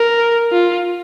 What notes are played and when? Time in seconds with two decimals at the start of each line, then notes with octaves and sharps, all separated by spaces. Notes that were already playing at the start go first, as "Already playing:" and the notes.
Already playing: A#4
0.52 F4